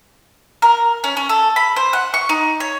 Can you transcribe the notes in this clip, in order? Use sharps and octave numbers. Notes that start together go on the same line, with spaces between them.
A#4
C#4
C#4
A4
B5
C5
F#5
C#6
D#4
C#5